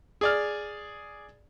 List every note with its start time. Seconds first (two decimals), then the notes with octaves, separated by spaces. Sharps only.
0.21 G#4 D5 F6